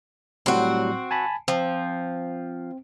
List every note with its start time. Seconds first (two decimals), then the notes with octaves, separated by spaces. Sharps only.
0.46 A2 F#3 G3 C4 F#4
1.11 G#5 A5 B5
1.48 F3 C4